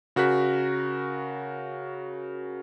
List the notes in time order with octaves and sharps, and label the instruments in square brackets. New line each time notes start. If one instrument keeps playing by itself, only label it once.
[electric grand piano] C#3 F#4 A#4 F#6 B6